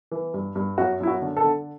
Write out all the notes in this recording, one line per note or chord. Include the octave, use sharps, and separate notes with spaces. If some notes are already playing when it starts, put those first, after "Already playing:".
E3
G2
G2
F#2 F#4
F#2 E4
F#4
D3
A4
D3